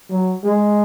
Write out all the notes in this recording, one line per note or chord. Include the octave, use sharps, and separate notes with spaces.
F#3
G#3